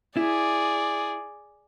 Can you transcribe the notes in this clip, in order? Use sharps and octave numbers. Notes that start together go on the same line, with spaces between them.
E4 G#4 D5